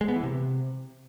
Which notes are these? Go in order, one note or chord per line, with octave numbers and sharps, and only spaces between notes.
G#3
B3
E3
C3